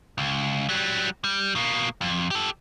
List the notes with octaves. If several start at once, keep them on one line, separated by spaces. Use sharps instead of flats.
C#2
F#3 G3
G3
B2 A#3
F2
G4 A4